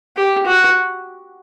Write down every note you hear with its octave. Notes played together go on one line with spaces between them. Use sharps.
G4
F#4